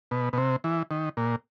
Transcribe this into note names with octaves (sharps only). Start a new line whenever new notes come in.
B2
B2
C3
E3
D#3
A#2